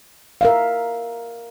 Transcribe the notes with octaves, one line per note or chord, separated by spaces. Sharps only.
A#4 E5 F5